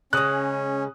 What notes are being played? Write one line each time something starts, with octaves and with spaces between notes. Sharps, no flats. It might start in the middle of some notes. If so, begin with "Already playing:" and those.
C#3 G#3 C#4 D#6 F#6